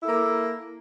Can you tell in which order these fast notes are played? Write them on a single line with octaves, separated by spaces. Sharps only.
E4 A4 A#3